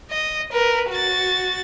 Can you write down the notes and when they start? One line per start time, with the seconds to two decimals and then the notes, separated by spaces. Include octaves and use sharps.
0.10 D#5
0.52 A#4 B4
0.90 F#4 A6